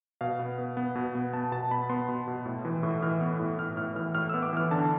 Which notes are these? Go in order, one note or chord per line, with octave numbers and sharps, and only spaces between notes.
B2 F5
B3
B3
B3
B2
B3
B3 A5
B2 A5
B3 B5
B3 C6
B2
B2
A2
E3
A2
E3 F6
B3
A2
A2 F6
A2 F6
E3 F6
A2 F6
B3 E6
D6
E3 F6
D3 A5